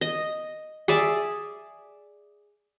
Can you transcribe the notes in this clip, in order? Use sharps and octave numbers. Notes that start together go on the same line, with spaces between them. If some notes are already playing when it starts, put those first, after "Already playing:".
D#5
G#4 D5 E5